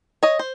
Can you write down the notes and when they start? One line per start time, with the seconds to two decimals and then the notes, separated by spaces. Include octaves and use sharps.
0.23 C#5 D#5
0.39 C5